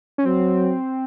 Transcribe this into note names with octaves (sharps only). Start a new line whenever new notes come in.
C#4
F#3 C4